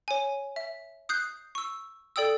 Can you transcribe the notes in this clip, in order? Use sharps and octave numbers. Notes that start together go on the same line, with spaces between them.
C#5 G#5
E5
D#6 F#6 G6 C7
C#6 E6
A4 D5 G5 D#6 E6